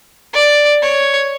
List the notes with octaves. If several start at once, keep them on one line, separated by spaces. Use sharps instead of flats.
D5
C#5